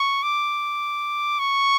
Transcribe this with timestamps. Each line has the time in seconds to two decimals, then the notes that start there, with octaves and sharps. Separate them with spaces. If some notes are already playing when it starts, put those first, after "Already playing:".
Already playing: C#6
0.23 D6
1.39 C#6